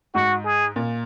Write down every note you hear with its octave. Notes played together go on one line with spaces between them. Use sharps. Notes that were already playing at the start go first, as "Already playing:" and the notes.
G#2 F#4
G#4
A#2